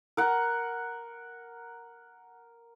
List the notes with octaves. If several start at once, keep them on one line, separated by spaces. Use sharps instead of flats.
A#4 F#5